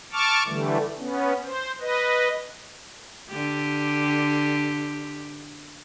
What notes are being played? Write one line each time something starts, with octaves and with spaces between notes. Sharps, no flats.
A5 C#6 D6 F6
D3 E3 G3 A3
B3 C#4
C5
B4 D#5
D3 G4